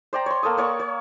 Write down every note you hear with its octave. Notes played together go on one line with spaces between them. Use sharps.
C5 D5 G5 A#5
C#5 C6
A#3 A4 G5 D#6
A#3 C#5 D5 C#6
C#5